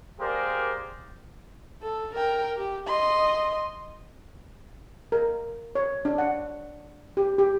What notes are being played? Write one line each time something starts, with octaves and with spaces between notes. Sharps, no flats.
A#3 G4 G#4 A#4 C5 D5
A4
A#4 G5
G4
D#5 C6
A#4
C#5
D4
F#5
G4
G4